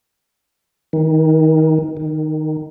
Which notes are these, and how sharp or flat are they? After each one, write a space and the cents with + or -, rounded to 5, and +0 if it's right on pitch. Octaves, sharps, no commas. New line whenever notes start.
D#3 +25
D#3 -10